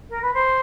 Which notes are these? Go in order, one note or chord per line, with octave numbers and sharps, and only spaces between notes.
A#4
B4
C5